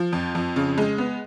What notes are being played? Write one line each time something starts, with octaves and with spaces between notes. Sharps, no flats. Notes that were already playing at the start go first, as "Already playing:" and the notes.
Already playing: F3
F2
F2
C#3
G#3
B3